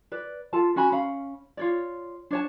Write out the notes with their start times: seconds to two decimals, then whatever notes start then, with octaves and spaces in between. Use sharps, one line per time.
0.12 B4 D5
0.53 F4 A4 A5
0.76 C#4 F#4 G#5 B5
0.92 C#4 F5 B5
1.57 F4 C#5 D5
2.31 D4 C#5 A5